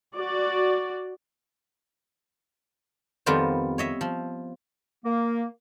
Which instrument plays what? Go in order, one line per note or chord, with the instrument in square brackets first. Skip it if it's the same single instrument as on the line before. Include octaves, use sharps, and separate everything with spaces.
[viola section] F#4 D5
[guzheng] F2 D#3 G3 B3 F4 C5
C#5 D#5 E5
F3
[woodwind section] A#3